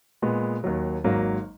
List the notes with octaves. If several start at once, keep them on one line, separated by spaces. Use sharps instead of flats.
A#2 G#3 B3
D#2 D#3 F#3
G#1 G#2 F#3 A#3